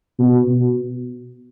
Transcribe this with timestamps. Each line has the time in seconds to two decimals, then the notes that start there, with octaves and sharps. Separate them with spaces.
0.19 B2
0.47 B2